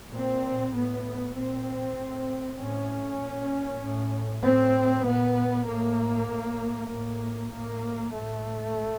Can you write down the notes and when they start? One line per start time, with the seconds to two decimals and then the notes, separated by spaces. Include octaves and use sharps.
0.12 A#2 C4
0.74 A2 B3
1.35 A#2 C4
1.97 A2
2.58 A2 C#4
3.20 A#2
3.82 A2
4.43 A2 C4
5.05 A#2 B3
5.67 A2 A#3
6.29 A2
6.90 A2 A#3
7.52 A2 A#3
8.14 A2 A3